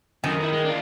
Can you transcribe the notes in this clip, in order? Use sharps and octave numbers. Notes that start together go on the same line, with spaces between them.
F#2 D3 D#3
D#4 E4
G#3
D4 F4